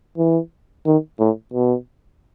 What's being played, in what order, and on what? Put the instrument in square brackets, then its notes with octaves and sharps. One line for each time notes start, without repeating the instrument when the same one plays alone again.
[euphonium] E3
D#3
A2
B2